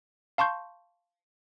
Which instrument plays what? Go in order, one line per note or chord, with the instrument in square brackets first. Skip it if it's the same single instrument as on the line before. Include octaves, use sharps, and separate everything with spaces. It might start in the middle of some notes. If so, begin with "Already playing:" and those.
[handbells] F5 A5 C6 C#6 G6